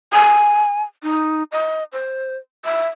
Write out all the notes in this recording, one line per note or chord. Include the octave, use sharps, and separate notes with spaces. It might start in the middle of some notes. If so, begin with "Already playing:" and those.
G#5
D#4
D#5
C5
E5